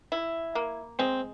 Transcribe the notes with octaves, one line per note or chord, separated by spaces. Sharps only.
E4
A#3
G#3 C4